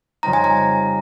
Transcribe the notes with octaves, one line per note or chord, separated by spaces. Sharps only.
F2 C#3 G3 C4 D#4 A#5
G#5
A#5